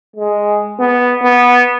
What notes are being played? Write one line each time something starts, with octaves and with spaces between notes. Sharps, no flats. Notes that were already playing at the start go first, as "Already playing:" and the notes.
G#3
B3
B3